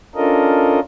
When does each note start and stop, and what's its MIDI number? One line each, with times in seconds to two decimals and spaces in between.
0.15 0.80 61
0.15 0.80 62
0.15 0.80 65
0.15 0.80 69
0.15 0.80 70
0.15 0.80 75